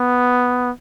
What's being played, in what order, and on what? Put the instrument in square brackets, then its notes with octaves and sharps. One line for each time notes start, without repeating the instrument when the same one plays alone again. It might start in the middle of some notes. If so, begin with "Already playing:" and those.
Already playing: [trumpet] B3